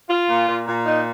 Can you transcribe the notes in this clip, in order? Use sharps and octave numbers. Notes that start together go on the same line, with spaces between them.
F4
A#2
A#2
A#2
D#4